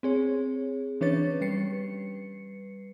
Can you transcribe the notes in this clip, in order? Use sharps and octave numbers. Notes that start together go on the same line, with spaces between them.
C4 G#4 C#5
E3 C#4 D4 B4 C#5 A6
G3 B4 C7 C#7